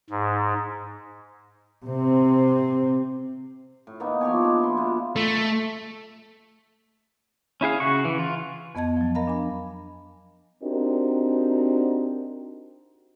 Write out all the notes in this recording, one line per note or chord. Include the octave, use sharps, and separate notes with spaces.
G#2
C3 C4
A2
D#3 A#3 B3 D#4
F3 G4 C#5 G#5
G#3 D4
E4 C6
B2 F4
A3
C#4 E4 G#4 F5
C#3 F#4 C#6
E3
F4
F2 B3 D#5 A5 G#6
F3 F#3
A#4 D#5 F5 A#5 B5
D4 G#5 B5
C4 D4 D#4 F#4 G4 A#4